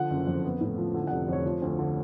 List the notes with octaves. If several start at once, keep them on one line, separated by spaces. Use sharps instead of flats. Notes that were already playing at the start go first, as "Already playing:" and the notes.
Already playing: D3 F3 F#5
F#1
F2
B3
A2
F3
D3
F#5
F1
F2 C#5
F3
D2
D3